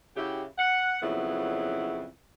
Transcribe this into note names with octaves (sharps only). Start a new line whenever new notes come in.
C#3 E4 F#4 G4
F#5
F2 C#3 F#3 B3 E4